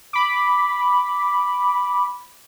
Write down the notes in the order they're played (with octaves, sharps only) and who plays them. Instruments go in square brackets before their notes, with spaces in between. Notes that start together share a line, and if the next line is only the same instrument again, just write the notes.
[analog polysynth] B5 D6